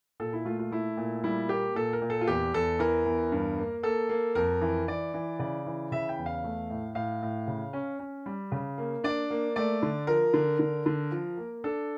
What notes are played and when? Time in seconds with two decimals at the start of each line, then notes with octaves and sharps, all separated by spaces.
0.20 A#2 A4
0.33 E4
0.45 A3 F4
0.59 F4
0.71 A3 E4
0.97 A#2
1.24 G3 E4
1.49 A#3 G4
1.75 A#2 A4
1.93 A#4
2.02 A#2
2.10 A4
2.21 F4
2.27 E2 G4
2.54 E2 A4
2.79 E3 A#4
3.05 E2
3.32 G2
3.58 A#3
3.83 A#3 A4
4.09 A#3
4.35 F2 A#4
4.61 E3
4.88 E3 D5
5.14 E3
5.39 C#3 D5
5.66 E3
5.92 C#3 E5
6.09 G5
6.18 E2
6.26 F5
6.44 A3
6.70 A2
6.95 A2 F5
7.22 A2
7.47 C#3
7.73 C#4
7.99 C#4
8.26 G3
8.52 C#3
8.78 A#3
9.04 D4 D5
9.30 A#3
9.56 A3 D5
9.82 D3
10.07 F3 A#4
10.34 D3
10.59 D3
10.86 D3
11.12 F3
11.37 A#3
11.64 D4 A4